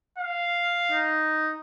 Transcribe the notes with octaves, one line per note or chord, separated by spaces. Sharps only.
F5
D#4